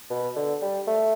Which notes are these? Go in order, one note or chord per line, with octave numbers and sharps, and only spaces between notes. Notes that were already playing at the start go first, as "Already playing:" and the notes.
B2
D3
G3
A3